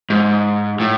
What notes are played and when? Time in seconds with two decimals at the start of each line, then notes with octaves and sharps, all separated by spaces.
0.10 G#2
0.80 A2